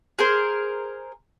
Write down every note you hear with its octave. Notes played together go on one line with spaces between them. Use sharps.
G#4 A#4 C5